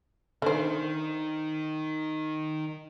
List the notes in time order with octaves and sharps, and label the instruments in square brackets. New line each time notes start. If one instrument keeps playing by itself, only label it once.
[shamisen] D3 C5 [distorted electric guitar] D#3